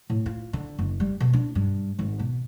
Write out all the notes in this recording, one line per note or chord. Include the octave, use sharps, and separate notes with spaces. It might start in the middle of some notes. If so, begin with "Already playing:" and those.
A2
F4
D3
F#1
G3
B2
D4
G2
G#1
B2